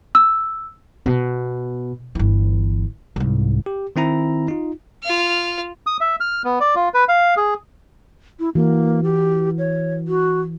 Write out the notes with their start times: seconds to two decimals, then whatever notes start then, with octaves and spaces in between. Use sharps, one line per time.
0.15 E6
1.06 B2
2.15 G1 E3
3.16 C2 G#2
3.66 G4
3.96 D#3 C4 E4 A#5
4.48 D#4 F4
5.03 F4 F6
5.87 D#6
6.01 E5
6.20 F6
6.45 B3
6.60 D5
6.75 F4
6.94 B4
7.08 F5
7.37 G#4
8.39 E4
8.55 E3 A#3 F#4
9.03 G4
9.58 C#5
10.08 F#4